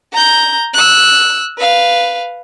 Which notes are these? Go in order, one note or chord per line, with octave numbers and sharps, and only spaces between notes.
A#5 G6
E6 F#6
B4 F5